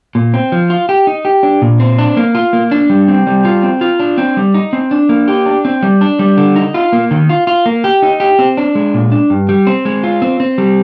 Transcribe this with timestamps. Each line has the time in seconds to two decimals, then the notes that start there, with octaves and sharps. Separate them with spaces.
0.15 A#2
0.34 C4
0.52 F3
0.70 F4
0.89 G4
1.07 D#4
1.25 G4
1.43 D4
1.62 A#2
1.80 C4
1.98 D4
2.17 A#3
2.35 F4
2.53 A#3
2.71 D4
2.90 G3
3.08 C4
3.27 G3
3.45 F4
3.63 C4
3.81 F4
4.00 D4
4.18 C4
4.37 G3
4.54 D#4
4.73 C4
4.91 D4
5.09 A#3
5.28 G4
5.46 D4
5.65 C4
5.83 G3
6.01 D4
6.19 G3
6.37 D3
6.56 D#4
6.74 F4
6.93 A#3
7.11 D#3
7.29 F4
7.47 F4
7.66 A#3
7.84 G4
8.02 D#4
8.20 G4
8.39 C4
8.57 D4
8.75 G#3
8.94 A#2
9.12 D4
9.30 G2
9.49 G3
9.67 C4
9.85 G#3
10.03 F4
10.22 C4
10.40 C4
10.58 G3